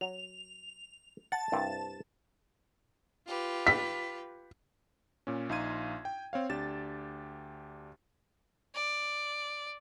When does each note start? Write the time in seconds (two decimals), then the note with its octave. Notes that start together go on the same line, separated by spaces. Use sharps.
0.01 F#3 F7
1.32 F#5 A5 A6
1.52 C2 G2 C4
3.27 F4 G4 B4
3.67 B6
5.27 A#2 C#4
5.49 A#1 D#4 F5 C6 G#6 D#7
6.05 G5
6.33 C4 C#5 F5
6.49 D2 D4 G4 A6 E7
8.75 D5